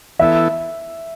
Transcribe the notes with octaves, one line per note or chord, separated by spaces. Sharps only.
E3 B3 E4 A4 E5